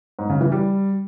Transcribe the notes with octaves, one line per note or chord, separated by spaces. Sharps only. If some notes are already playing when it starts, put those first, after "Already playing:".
G#2
C#3
E3
G3